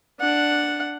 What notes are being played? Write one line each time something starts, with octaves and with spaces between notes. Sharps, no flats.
D4 F#5